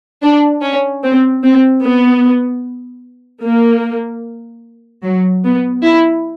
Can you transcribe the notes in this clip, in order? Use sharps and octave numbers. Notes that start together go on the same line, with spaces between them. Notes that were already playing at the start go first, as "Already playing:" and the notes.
D4
C#4
C4
C4
B3
A#3
F#3
B3
E4